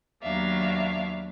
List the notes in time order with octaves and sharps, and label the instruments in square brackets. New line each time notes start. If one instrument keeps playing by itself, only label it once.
[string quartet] D#2 F#3 B3 D4 E5 F5